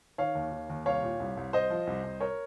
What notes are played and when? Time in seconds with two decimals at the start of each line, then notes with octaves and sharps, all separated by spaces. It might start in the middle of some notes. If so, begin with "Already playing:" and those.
0.18 D#3 C#5 F5
0.35 D#2
0.52 D#3
0.70 D#2
0.86 C2 C#5 F5
1.03 A#2
1.20 C2
1.37 C2
1.53 C2 C5 D#5
1.70 F3
1.87 C2
2.04 C2
2.21 A#4 C#5